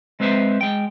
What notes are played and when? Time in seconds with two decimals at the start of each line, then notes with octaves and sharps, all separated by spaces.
0.20 G#3 C4 B4 C5 E5
0.61 G#3 G5